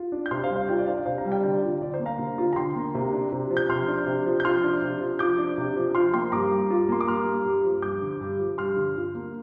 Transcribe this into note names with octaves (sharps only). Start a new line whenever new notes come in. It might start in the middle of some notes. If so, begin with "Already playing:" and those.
Already playing: F4
D4
G6
C3 C6 F6
C5 F5
G3
C5 F5
F4 D5 G5
D5
D4 C5 F5
D5
C3 C5 F5
F5 A#5
G3
D5 G5
D3 D5 G5
F4
D3 D5
C5
A#3
F5 A#5
D3
F4
A#5
D3 G5 C6
A#3
C3
D4
C3
F3
G6
C3 C6 F6
D4
C3
F3
G6
F4 C6 F6
D4
C3
F3
F4 D6 G6
D4
C3
F3
F4 C6 F6
A#3 G5 C6
G2 A#5 D6
G3
F4
A#3 C6
D6
G2 C6 F6
G3
G2
F3
G2 D6 G6
D3
G2
F3
G2 C6 F6
D3
F4
A#3